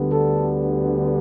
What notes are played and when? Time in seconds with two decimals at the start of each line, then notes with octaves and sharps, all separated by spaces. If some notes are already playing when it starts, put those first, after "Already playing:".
Already playing: D2 D3 G3 B3
0.12 A4